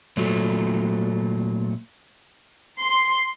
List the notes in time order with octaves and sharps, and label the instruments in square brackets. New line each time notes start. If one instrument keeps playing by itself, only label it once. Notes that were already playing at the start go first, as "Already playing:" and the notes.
[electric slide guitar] A#2 F#3 A3
[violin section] C6